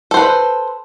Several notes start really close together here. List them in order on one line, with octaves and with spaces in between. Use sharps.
A4 C5 B4